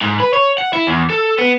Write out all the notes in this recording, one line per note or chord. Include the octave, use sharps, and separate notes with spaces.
G#2
B4
C#5
F#5
E4
E2
A4
B3